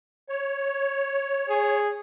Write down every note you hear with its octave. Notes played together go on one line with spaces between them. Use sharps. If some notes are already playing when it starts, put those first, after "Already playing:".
C#5
G#4